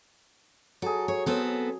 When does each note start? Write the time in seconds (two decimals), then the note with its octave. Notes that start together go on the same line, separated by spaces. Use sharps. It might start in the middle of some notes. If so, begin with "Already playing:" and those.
0.82 F#3 G#4 A4
1.08 C#5
1.26 B3 C4 A4